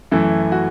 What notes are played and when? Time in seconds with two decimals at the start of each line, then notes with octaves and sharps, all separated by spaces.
0.11 F#2 E3 A3 E4
0.52 F#4